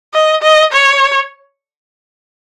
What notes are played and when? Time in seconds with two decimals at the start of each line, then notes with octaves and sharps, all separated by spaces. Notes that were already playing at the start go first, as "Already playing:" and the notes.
0.14 D#5
0.42 D#5
0.73 C#5